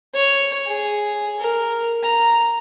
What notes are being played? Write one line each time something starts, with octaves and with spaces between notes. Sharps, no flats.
C#5
G#4
A#4
A#5